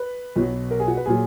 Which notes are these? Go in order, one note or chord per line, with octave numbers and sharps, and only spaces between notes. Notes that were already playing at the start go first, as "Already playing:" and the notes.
Already playing: B4
B1 B2 F#3
A#4
G#4
F#4
B4
A#2 F#3 G#4